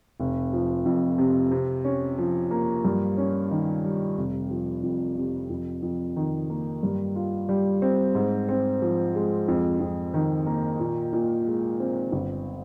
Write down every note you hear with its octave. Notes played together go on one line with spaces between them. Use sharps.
F1
F3
F2
C3
C3
C#4
F3
A#3
G2
C#4
D#3
G3
F1
F3
F2
C3
F2
F2
D#3
A#3
G2
F4
G3
C4
G#2
C4
F3
G#3
F2
F2
D#3
A#3
A#2
A#2
G#3
C4
G1